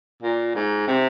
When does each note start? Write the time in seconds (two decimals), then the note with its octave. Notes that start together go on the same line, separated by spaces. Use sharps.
0.22 A#2
0.55 G#2
0.88 C3